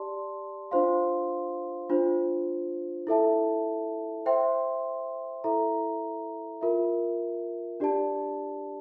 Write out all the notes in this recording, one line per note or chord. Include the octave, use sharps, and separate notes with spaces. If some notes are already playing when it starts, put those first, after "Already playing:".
Already playing: G4 D5 A5 C6
D4 F4 C5 F5 C6
D4 F4 C5
E4 A4 E5 A5
C5 E5 G5 C6
E4 A4 E5 A#5
F4 A#4 E5
D4 G4 D5 A5